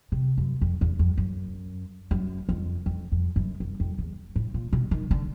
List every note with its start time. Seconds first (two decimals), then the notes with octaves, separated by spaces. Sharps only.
0.12 C3
0.38 F#2
0.61 F2
0.81 E2
0.99 F2
1.17 F#2
2.11 F#2
2.49 F2
2.86 F2
3.12 F2
3.36 F#2
3.60 F#2
3.80 F2
3.98 E2
4.36 A2
4.54 A#2
4.73 B2
4.91 D#3
5.11 D3